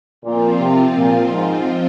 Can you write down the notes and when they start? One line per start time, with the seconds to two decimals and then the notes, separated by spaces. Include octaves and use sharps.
0.23 A#2 F3 C4 F4
0.60 C3
0.95 A#2
1.32 G#2